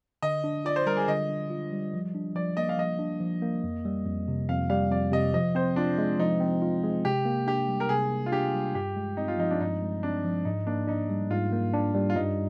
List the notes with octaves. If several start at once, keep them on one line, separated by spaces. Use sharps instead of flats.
D3 D#5
D4
F4 D5
C5
G3 A#4
G#4
D3 D#5
D4
F4
G3
F3
D4
F3 D5
A#3 D#5
F5
F3 D#5
D4
F3
A#3
F2
G3
F2
C3
F2 F5
G3 F5
F2 D5
C3 D#5
F3 D#5
C4 C5
D4 F4
G#3
F3 D#4
C4
F4
G#3
C3 G4
A#3
D4 G4
G3
A#4
C3 G#4
A#3
F4
D4 G4
G3
G2 G4
G#3
C4 D#4
F4
F3 D#4
D4
G2 D#4
G#3
C4 D4
F3
G#2 D#4
A#3 D4
D4 D#4
G3
G#2 F4
A#3
D4
G3
F4
G2 D#4